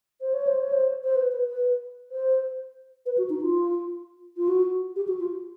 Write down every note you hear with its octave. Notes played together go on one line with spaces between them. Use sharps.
C5
C#5
C5
C#5
C5
C5
B4
B4
B4
C5
B4
F#4
D#4
F4
F4
F#4
G4
F#4
F4